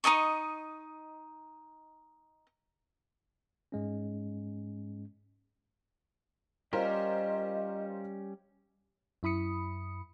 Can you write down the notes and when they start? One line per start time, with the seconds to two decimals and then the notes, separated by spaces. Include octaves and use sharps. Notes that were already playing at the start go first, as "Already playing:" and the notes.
0.04 D#4 A#4 D#5 C#6
3.72 G#2 G#3 C#4
6.73 G3 C#4 F4 G4 A#4 C5 D#5
9.23 F#2 E4 B5 D#6 C#7